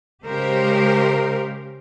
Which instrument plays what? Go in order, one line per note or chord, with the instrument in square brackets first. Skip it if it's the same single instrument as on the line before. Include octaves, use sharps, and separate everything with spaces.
[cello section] C#3 G#3 G4 A#4 C5